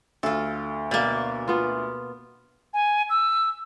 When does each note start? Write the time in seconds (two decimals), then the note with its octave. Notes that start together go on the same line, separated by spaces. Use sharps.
0.23 D2 F4 A4
0.91 B2 A#3 D5
1.48 B3 F4
2.74 G#5
3.10 E6